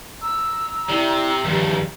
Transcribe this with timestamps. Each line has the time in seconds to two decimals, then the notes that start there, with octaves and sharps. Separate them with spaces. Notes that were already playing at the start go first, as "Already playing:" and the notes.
0.21 A#5 E6
0.89 C3 E4 D5
1.45 C#2 G2 D#3 F3 G4